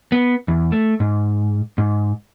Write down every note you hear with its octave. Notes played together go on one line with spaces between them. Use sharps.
B3
E2
A3
G#2
G#2